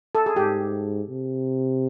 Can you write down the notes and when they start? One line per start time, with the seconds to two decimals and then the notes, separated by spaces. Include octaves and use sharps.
0.15 A4
0.26 G#4
0.36 G#2 G4
1.10 C3